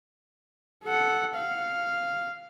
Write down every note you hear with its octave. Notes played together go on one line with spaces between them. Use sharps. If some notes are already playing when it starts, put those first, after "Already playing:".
A4 F#5
F5